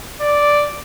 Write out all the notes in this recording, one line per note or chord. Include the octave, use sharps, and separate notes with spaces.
D5